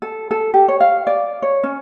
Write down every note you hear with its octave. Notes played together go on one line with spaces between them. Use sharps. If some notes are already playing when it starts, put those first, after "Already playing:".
A4
A4
G4
C#5
F5
D5
C#5
C#4